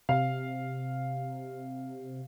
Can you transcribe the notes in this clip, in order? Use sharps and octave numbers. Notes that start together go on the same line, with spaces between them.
C3 F5